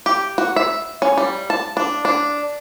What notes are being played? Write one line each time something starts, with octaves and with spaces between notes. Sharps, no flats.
G4
F#4
E5
C#4
G3
A5
D4
D4